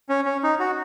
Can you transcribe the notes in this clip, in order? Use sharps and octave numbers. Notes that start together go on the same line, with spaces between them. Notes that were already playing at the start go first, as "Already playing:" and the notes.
C#4
C#4
D#4
F#4